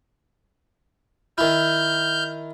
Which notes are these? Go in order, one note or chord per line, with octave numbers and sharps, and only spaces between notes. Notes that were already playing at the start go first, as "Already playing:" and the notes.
D#3 E4 F6 G6